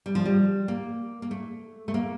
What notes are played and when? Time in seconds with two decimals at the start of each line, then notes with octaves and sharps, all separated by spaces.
0.06 G3
0.15 F3
0.25 G3
0.68 A#3
1.22 A#3
1.31 A3
1.88 A3
1.94 A#3